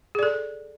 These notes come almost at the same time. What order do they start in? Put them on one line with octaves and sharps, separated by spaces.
G#4 D5 A4